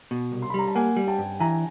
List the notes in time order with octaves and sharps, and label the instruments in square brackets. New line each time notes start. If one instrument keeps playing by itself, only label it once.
[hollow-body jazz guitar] B2
C2
[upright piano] C6
B5
[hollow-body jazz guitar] G3 [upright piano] A#5
[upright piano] A5
[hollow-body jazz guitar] A#3 [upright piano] F#5 G#5
[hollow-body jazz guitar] G3
[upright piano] G5 A5
[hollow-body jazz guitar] G2
[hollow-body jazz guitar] E3 [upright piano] G#5 A#5